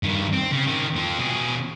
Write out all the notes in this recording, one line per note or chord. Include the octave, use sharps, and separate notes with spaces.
G2 D#3
C4
C#3
D#3 C4
F3 C4
B2 G#4